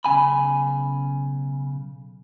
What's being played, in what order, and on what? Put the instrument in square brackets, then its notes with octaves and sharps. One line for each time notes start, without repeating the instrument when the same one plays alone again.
[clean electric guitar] B1 C#3 G#5 B5